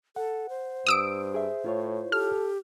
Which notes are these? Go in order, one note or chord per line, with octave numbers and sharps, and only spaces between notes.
A4 F#5
C5
G2 D#6 E6 D7
G#4 E5
A2 E4 F4 C#5
G4 A4 F6